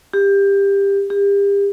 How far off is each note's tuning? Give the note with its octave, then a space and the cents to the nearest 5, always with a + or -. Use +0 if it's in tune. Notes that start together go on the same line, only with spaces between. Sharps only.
G4 +20
G4 +35